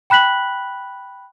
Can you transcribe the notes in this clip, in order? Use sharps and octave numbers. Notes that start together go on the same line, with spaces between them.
G5 B5 F#6 B6 F#7